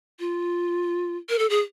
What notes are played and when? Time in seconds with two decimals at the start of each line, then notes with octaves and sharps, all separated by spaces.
0.20 F4
1.29 A#4
1.39 A4
1.50 G#4